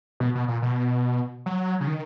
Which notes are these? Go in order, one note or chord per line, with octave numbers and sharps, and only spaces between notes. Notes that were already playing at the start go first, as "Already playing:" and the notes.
B2
B2
A#2
B2
F#3
C#3
D#3